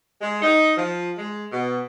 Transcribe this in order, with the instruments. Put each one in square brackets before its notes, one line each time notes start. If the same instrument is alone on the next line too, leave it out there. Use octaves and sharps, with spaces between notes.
[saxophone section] G#3
D#4
F3
G#3
B2